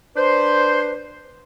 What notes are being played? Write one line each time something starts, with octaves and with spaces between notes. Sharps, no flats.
D4 B4 C5